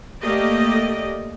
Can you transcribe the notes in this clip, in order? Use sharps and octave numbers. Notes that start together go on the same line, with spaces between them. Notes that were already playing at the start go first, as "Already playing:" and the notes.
A3 A#3 G4 D5 D#5